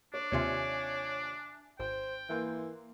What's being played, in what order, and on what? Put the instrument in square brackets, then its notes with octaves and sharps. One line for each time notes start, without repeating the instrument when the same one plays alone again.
[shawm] D4 [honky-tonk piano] C#5
[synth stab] D#2 C3 F4 [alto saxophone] C#5 [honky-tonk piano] D5 E5 G#5
[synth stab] G#1 [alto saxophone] C5 [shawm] G5
[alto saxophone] E3 [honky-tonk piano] A#3 C6